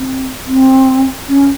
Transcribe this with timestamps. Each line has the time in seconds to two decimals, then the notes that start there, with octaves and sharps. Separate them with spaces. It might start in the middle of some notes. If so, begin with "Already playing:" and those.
Already playing: C4
0.46 C4
1.29 C#4